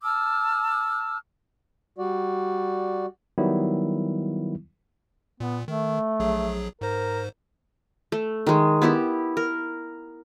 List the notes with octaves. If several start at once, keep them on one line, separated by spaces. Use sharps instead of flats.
A5 D6 E6 F6
G3 F#4 D5
D#3 F#3 G3 B3 E4
A#2 B3
D#3 A3
A#1 F#3 G#4
G#2 A#4 C5
A3
D#3 G#3
B3 E4 G4
A#4